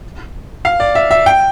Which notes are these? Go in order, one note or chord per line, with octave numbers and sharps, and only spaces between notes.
F5
D5
E5
E5
G5